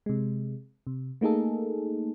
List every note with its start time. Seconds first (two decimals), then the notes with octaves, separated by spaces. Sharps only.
0.06 C3 G#3
0.87 C3
1.21 A3 A#3 D#4 G#4 A4